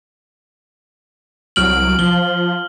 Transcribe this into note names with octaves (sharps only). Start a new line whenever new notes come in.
C2 F#3 F6 D7 F#7
F3 G7